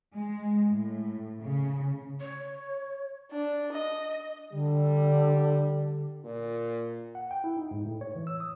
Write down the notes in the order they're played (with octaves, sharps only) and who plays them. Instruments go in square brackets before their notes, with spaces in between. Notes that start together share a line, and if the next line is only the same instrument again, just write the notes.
[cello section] G#3
A2
C#3
[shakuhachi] C#5
[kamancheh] D4
D#5
[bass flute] D3 [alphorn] G3
[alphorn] A#2
[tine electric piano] F#5
G5
E4
D#4
G#2
A2
C#5
E3
E6
D#6